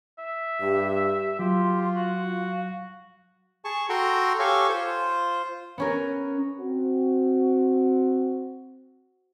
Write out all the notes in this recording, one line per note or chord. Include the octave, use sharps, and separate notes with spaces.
E5
G2 G4
F#3 F4 G4 C6
F#4 F5
G#4 A5 C#6
F#4 A4 G5 A#5 C6
G4 A4 C#5 F5 G#5 C#6
F4 C5
B3 C#4 A#4
C4 F#4